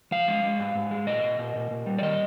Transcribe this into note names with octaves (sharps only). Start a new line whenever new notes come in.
F3 F5
G#3
G#3
G#2
G#2
G#3
A#2 D#5
A#2
A#2
A#2
A#2
G3
D5
D#3 D#5